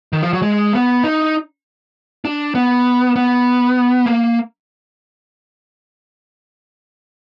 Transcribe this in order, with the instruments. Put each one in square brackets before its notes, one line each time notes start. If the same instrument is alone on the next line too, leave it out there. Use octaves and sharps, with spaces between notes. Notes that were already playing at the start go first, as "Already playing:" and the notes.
[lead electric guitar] D#3
F3
F#3
G#3
B3
D#4
D4
B3
B3
A#3